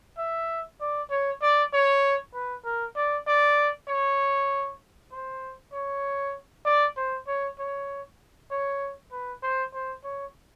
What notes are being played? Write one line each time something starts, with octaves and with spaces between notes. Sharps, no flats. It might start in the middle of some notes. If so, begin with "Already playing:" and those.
E5
D5
C#5
D5
C#5
B4
A#4
D5
D5
C#5
C5
C#5
D5
C5
C#5
C#5
C#5
B4
C5
C5
C#5